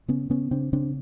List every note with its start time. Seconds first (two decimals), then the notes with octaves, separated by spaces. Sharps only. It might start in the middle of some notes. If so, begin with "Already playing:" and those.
0.08 C#3 B3 C#4
0.30 C#3 B3 C#4
0.51 C#3 C4 D4
0.73 C#3 C4 D4